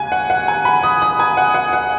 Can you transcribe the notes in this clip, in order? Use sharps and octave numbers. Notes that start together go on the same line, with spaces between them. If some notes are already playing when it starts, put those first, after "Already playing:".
Already playing: D#2 C#3 G#3 F#5 G#5
F#5
F#5
G#5
B5
D#6
D#6
G#5
F#5
F#5
F#5